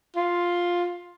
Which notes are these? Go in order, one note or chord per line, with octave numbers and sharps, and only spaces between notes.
F4